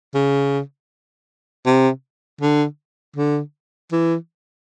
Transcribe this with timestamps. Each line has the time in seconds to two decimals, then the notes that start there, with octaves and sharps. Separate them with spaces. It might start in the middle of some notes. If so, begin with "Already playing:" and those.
0.14 C#3
1.66 C3
2.41 D3
3.16 D3
3.92 E3